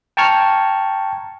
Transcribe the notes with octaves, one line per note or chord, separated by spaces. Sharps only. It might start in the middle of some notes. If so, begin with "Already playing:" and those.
G5 A5 A#5 C#6 F6 G#6